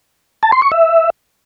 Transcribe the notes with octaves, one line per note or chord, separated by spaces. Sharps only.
A5
C6
C#6
E5